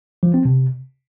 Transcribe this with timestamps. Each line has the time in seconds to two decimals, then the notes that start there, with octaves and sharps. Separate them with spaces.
0.23 F3
0.34 C4
0.45 C3